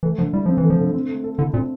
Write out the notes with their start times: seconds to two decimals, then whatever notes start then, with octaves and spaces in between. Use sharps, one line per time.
0.03 E3 A3
0.18 D3 F3
0.33 G3 E4
0.46 F3 C4
0.58 E3
0.64 A3
0.70 F3
0.79 D3
0.94 C4
1.09 A3
1.24 A4
1.38 D3 E4
1.54 A#2 C4